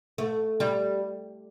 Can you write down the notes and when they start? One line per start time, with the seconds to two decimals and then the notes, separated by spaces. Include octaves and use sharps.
0.18 A3
0.60 G3